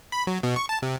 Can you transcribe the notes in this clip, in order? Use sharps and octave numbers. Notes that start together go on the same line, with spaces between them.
B5
F#3
B2
C#6
A5
C3